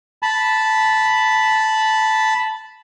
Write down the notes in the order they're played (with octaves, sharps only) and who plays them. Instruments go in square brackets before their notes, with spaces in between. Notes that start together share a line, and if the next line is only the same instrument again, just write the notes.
[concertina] A5 B5